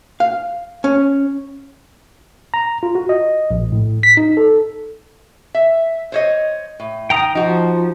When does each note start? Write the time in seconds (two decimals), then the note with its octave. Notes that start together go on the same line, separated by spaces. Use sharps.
0.20 F5
0.84 C#4
2.54 A#5
2.83 F4
2.95 F#4
3.09 D#5
3.51 A#1
3.72 A2
4.03 B6
4.17 D#4
4.37 A4
5.54 E5
6.12 C5 C#5 D#5
6.80 A2
7.10 D#3 G5 A#5 D#6
7.35 F3 D#4 F#4